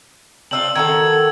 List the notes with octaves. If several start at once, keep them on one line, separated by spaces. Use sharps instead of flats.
C4 D4 F4 E6 F#7
D#3 F#4 A4 G#6